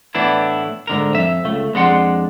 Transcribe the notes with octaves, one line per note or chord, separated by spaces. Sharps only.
A2 E3 B3 D4 E4
G#2 D3 A#4
F2 E5
C#2 A3
F2 G#3 D4 F#5 C6